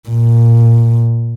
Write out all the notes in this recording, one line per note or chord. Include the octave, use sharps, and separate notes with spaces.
A#2